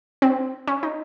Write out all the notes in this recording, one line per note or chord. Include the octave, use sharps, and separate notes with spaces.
C4
C#4
D#4